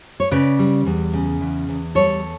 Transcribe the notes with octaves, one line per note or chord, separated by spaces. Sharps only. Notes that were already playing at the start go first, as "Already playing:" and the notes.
C#5
C#3 B4 D5
G3
E2
C#3
E2
E2
G3 A4 C#5